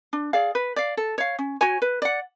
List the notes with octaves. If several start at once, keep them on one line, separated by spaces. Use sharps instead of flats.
D4
G#4 D5 F5
B4
D5 F5
A4
C#5 F5
C#4
F#4 C#5 G#5
B4
D5 F#5